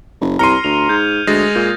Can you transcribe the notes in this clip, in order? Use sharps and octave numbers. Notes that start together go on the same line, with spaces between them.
F#1
C2 A#5 C6 F6 C#7 D#7
D2 F7
G#2 G6 G#6
D2 G#3 D#6 A6 A#6
A#2 G6